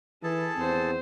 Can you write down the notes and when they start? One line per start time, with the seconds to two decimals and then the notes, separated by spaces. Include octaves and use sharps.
0.23 E3 E4 G#4 A4 A5
0.58 E2 C4 C5